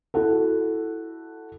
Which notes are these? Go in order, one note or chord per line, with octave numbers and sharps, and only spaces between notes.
E4 F#4 A4